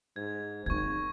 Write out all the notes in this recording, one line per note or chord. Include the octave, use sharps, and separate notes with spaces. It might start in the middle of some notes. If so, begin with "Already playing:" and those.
G#2 G#6
G#1 C4 D#4 C#6 G#6